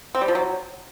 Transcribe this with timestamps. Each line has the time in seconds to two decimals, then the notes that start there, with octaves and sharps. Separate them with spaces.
0.15 C4
0.21 G3
0.28 F3
0.35 F#3